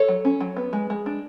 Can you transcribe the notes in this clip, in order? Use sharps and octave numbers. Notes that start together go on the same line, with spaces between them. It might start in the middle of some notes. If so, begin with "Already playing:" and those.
Already playing: A4 C#5
F#3
C#4
F#3
B3
G#3
G#3
D4